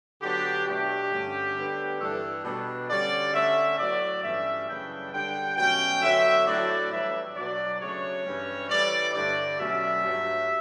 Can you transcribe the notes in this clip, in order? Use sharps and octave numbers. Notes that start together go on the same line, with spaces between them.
D3 F#3 B3 D4 G4
B2 A3 D4 G4
G2 D3 A3 C#4
D3 G3 B3 D4
G2 E3 A3 D4 A4
B2 G3 D4
D3 G3 C#4 D5
D3 A3 C#4 E5
A2 F#3 B3 D5
G2 E3 A3 C#4 E5
F#2 C#3 E3 G3 D4 G5
D3 G3 D4 G5
B2 F#3 A3 C#4 G5
D3 F#3 B3 E5
A2 F#3 A3 D4 D5
A2 E3 G3 D4 E5
B2 F#3 B3 D4 D5
C#3 F#3 A3 D4 C#5
G2 E3 G3 C#4
A2 E3 G3 D5
G2 D3 A3 D5
B2 F#3 A3 C#4 E5
G2 F#3 A3